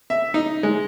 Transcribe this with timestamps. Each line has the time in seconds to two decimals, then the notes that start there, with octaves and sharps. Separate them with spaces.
0.10 E5
0.34 D#4
0.63 G#3